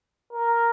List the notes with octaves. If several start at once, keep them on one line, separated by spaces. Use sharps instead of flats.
A#4